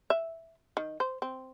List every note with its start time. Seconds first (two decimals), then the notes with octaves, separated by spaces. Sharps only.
0.10 E5
0.77 D#3
1.00 C5
1.22 C4